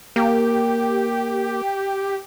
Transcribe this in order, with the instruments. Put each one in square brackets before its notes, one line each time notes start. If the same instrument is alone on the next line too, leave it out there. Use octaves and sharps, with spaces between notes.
[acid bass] A#3 [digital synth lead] G4